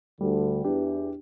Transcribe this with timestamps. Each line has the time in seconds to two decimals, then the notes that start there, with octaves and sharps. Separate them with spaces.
0.20 D2 D3 G3
0.64 E2 E3 D4 G4